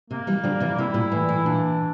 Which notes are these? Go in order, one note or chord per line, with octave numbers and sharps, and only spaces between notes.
C3 A#3
E3 G3
D3 F3 G3
C3 E3
C3 E4
A#2
A2 E3
A2
A#2 D4